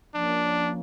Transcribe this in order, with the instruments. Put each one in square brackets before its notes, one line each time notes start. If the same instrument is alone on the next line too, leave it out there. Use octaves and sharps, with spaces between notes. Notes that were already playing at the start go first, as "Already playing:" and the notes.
[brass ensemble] F3 A#3 C#4 [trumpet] D4